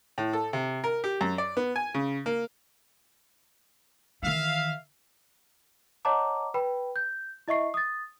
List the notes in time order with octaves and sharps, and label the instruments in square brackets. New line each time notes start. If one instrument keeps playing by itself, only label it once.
[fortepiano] A2
A4
C3
A#4
G4
F#2
D5
B3
G#5
C#3
A#3
[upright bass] D#3 E3 [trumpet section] E5 F5
[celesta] C#5 D#5 F#5 A5 A#5 D6
B4 G5 B5
G6
E4 D#5 E5 C#6 C7
D#6 A6